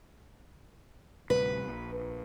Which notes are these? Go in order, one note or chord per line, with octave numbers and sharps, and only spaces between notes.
D1 C3 G3 B4
A#1